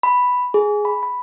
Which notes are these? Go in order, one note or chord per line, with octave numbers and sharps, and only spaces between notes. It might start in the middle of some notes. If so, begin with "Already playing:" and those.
B5
G#4
B5
B5